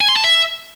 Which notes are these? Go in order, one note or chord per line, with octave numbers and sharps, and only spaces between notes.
G#5
C6
A5
E5